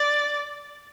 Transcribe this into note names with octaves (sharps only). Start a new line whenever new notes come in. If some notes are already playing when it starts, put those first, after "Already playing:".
Already playing: D5